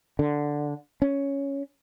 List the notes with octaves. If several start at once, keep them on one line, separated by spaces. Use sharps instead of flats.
D3
C#4